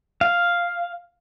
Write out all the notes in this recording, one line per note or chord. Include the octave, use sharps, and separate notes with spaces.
F5